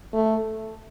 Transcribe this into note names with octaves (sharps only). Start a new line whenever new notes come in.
A3